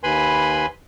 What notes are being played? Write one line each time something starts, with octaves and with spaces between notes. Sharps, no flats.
D#2 B4 G#5 B5 C6